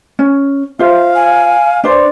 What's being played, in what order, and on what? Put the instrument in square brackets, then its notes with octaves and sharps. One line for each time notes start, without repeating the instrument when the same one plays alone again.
[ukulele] C#4
[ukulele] F4 C5 E5 [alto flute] F5
[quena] G#5
[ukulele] D4 B4 C5 [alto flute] D5